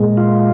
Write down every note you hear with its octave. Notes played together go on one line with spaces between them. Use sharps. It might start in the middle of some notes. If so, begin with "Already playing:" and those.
Already playing: A#2 G#3
F4